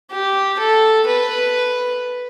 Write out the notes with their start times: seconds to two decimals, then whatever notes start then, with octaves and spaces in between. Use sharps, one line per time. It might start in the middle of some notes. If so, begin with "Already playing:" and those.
0.11 G4
0.59 A4
1.07 B4